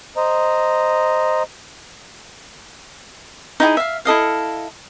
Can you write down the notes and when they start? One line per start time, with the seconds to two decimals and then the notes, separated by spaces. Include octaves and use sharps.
0.17 C5 D#5 A#5
3.60 D#4 E4 G4 G#4
3.77 E5 F5
4.05 E4 A4 D#5 F5